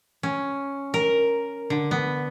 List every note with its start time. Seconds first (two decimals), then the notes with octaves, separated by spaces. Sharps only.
0.23 C#4
0.94 A#4
1.70 D3
1.91 B3